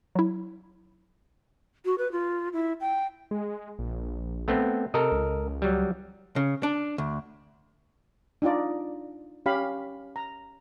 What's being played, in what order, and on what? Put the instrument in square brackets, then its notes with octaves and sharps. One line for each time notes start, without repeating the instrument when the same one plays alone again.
[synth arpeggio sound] F#3 E4
[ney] F#4
B4
F4
E4
G5
[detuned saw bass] G#3
A#1
[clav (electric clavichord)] A3 B3 C4
[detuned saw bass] C3 [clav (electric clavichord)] A4 A#4 D#5
[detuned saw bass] C#2
[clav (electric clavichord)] F#3 G3
[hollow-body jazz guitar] C#3
D4
D2
[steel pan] D4 D#4 F4 D5
C#4 G4 F5 B5
A#5